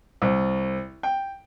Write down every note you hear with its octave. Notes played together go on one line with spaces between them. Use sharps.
C2
G5